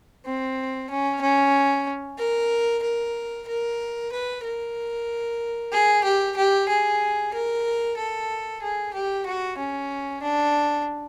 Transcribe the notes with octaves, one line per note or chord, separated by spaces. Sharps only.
C4
C#4
C#4
A#4
A#4
A#4
B4
A#4
G#4
G4
G4
G#4
A#4
A4
G#4
G4
F#4
C#4
D4